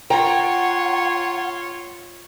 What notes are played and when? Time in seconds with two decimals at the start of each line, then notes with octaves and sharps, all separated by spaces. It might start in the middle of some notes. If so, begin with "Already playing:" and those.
0.10 F4 C#5 F#5 G5 A#5